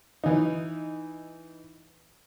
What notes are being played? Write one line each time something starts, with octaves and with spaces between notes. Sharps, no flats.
E3 D#4